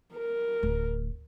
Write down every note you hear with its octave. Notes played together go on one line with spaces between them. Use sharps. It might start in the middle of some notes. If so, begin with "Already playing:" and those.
A#4
D1